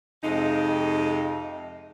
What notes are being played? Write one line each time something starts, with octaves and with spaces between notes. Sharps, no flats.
F2 C3 G#3 D#4